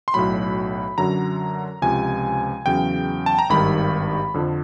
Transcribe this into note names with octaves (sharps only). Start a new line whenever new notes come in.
C6
B1 A2 F#3 B5
F#2 D3 F#3 A#5
C#2 C3 F3 G#5
E2 C#3 F#3 G5
A5
A#5
G#1 G2 D#3 G3 B5
F2 D3 F3